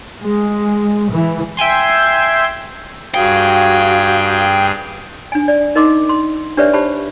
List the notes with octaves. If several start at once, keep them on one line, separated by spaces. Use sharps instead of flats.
G#3
E3
E5 G5 G#5 C6
G2 F#4 G#4 F5 G5
D4 G#5
D5
D#4 A#4 D#5 C6 D6
C6
D4 G4 B4 C#5 D5 E5
G4 C5 A5 B5